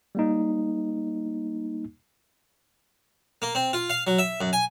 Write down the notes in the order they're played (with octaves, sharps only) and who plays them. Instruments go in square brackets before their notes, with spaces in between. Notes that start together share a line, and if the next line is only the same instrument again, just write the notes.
[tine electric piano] G3 A#3 D#4
[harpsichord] A#3
C4
F4
F5
F#3
E5
F#2
G#5